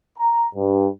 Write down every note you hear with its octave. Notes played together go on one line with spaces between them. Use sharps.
A#5
G2